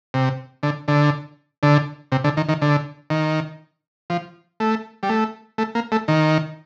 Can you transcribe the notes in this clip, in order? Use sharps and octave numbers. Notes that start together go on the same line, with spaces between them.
C3
D3
D3
D3
C3
D3
D#3
D#3
D3
D#3
F3
A3
G3
A3
A3
A#3
A3
D#3